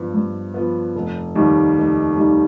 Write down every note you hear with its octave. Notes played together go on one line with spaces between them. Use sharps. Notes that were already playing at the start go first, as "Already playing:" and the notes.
Already playing: G2 F3 B3
G2
F3 B3
F1
D#2 D#3 G3
F1
D#2 D#3 G3